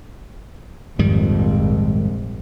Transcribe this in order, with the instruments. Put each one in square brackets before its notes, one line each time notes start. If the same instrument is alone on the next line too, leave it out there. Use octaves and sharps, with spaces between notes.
[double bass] A#1 F2 [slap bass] G#2 D#3 G3